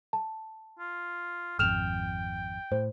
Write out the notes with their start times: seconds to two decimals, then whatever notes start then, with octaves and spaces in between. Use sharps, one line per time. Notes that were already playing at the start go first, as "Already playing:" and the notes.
0.13 A5
0.79 F4
1.59 G#1 F2 G5 F6 E7 F7
2.72 A2 C5